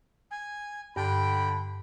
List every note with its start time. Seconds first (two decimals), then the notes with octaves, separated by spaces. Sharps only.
0.31 G#5
0.96 G2 D3 G5 A5 B5